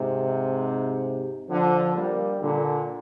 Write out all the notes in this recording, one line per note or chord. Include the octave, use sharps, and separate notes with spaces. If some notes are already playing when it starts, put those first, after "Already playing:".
Already playing: G#2 C3
D3 F3
G3 A#3
A#2 D3